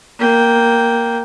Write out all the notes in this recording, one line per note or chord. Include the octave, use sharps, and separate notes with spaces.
A#3 G5